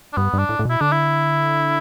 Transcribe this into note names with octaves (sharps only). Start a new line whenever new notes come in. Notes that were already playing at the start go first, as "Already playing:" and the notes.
D4
G2 B3
G2
D4
A2
A2
B2 E4
D3 D4
E4